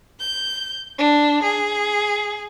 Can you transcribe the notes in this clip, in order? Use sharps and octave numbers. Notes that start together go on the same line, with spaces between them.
G6
D4
G#4